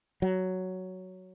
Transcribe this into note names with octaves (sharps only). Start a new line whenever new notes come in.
F#3